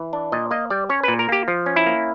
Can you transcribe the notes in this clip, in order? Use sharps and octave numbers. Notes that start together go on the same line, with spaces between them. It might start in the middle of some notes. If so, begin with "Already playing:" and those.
Already playing: E3
D4
A#2 D#5
A#3 D#5
G3 D5
C#4 C#5
A#2 B4
A#4
A#3 G4
F3
C#4
E4
A#3